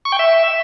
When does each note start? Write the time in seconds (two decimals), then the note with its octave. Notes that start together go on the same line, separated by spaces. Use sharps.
0.05 C#6
0.12 G5
0.19 E5